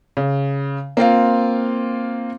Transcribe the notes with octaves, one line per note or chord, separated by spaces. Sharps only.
C#3
A#3 C4 F4 F5